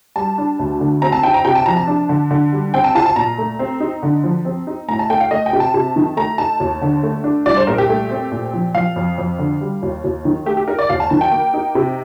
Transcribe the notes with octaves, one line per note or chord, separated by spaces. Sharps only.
G3 A5
D4
D2
D3
C4 A#5
A5
D#4 G5
A#5
C3 G5
A5
F3 A#5
A5
D4
D3
D3
G3
C4 G5
A5
F4 A5
A5
A#2 A#5
A3
C4
D#4
D3
F3
C4
D#4
A2 A#5
A5
A3 G5
F5
A3 D#5
G5
C3
A5
C3
D#3
A3 A#5
D#4 A5
D#2
D3
A3
D4
C2 D5
C5
A#2 A#4
G4
A3
C4
A#2
F3
F3 F5
F2
F2
D3
G3
D#2
D#2
D#3
A3 G4
G4
D#4 A#4
D5
D#2 F5
A5
D#3 A5
G5
A#3
D#4
C3